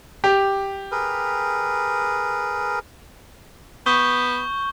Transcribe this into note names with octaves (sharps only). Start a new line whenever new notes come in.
G4
G#4 A#4 B4
B3 C#6 G6 G7